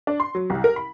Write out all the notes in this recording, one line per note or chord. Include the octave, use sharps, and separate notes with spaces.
D4
C6
F#3
C2
A#4
B5